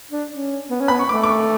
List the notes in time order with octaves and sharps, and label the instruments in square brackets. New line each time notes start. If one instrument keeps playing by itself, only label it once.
[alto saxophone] D4
C#4
B3
C#4
[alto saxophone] B3 [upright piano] B5
[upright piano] C#6
[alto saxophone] A3 [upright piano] D6
[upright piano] D6
C#6